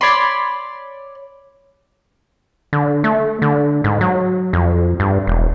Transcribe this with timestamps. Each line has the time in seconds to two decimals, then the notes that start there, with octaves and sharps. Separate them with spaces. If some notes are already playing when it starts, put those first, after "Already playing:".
0.01 C#5 D5 B5 C6
2.73 D3
3.04 A3
3.42 D3
3.84 G#2
4.01 F#3
4.53 F2
5.00 G2
5.27 E1